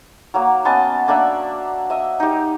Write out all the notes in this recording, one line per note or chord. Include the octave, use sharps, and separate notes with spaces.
F#3 A#3
B3 C#4 D#5 A5
A#3 D4 E5 F#5
D#5 E5
D#4 G4